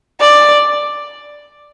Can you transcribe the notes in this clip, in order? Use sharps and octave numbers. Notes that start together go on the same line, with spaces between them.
D5